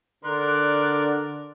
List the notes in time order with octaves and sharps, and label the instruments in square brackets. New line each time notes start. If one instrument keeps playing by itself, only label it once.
[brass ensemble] D3 [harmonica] A#4 C6 [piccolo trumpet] D5 [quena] F#6